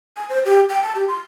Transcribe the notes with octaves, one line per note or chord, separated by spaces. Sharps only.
G#5
C5
G4
G5
A5
G4
C6